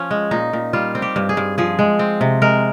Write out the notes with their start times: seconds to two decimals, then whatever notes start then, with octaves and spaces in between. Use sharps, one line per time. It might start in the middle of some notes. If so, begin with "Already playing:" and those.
Already playing: F3 C#4
0.11 G#3
0.31 A#2 D#4
0.53 A#2
0.73 G3 F4
0.95 C4
1.02 G4
1.16 G2
1.29 G#4
1.37 G2
1.58 F3 G#4
1.79 G#3
1.99 C4
2.21 C3
2.42 G#3 A#4